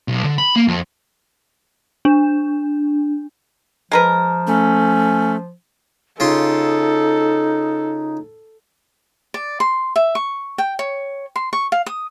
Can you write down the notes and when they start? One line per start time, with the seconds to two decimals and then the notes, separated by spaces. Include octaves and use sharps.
0.08 B1
0.24 D3
0.38 B5
0.56 A#3
0.68 F2
2.05 D4
3.92 F3 G#3 A#4 B4
4.47 A3 C#4
6.20 C#3 D#4 F4 A4 C6
9.34 D5
9.60 C6
9.96 E5
10.15 C#6
10.58 G5
10.79 C#5
11.36 C6
11.53 C#6
11.72 F5
11.86 D#6